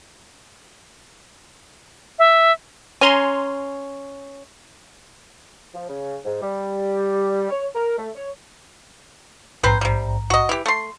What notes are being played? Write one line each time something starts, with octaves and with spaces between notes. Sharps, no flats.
E5
C#4 G#5 A#5 C6
F3
C#3
G#2
G3
C#5
A#4
A3
C#5
A#1 G#2 C4 B4 C5 A#5
C3 G3
F#4 D#5
E3 G4
A3 C6